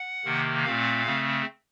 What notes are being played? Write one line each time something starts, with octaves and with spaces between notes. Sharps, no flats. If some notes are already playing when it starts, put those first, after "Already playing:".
Already playing: F#5
C3 D#3 A#3
A#2 A3 C4 F5
C#3 A3 C4